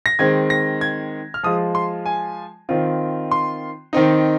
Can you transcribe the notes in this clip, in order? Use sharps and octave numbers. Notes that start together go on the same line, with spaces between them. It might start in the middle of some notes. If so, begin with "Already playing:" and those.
A#6
D#3 G#3 C4 G#6
A#6
G#6
F6
F3 G#3 F4 D#6
C6
G#5
D#3 C4 F4
C6
D#3 C4 D#4